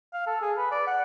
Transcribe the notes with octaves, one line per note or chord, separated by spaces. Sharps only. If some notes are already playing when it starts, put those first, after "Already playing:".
F5
A4
G#4
B4
D5
F#5